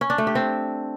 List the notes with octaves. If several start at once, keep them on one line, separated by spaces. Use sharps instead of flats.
C#4
D4
A3
G4
C4